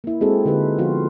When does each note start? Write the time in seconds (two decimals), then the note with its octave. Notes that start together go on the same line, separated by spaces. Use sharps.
0.04 A#3 E4
0.21 G#3 C4 F#4 G#4 A4
0.45 D3 G#3 D#4 F4 G4 B4
0.78 F3 B3 F4 F#4